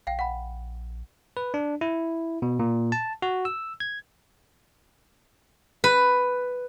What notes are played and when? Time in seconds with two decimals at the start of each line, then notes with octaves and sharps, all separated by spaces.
0.07 A#1 F5 G5
0.19 F#5 B5
1.37 B4
1.54 D4
1.81 E4
2.42 B2
2.59 A#2
2.92 A5
3.22 F#4
3.45 E6
3.80 G#6
5.84 B4